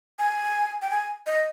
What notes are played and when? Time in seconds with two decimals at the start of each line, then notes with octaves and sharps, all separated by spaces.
0.19 G#5
0.82 G5
0.91 G#5
1.26 D#5